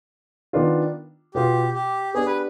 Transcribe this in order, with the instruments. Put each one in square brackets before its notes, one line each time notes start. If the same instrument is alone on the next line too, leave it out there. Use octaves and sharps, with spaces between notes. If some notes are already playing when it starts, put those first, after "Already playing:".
[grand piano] D#3 B3 D4 F4
[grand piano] B2 B3 F4 [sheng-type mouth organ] G4
[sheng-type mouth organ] G4
[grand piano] B3 D4 G4 [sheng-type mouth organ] G#4
[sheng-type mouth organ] B4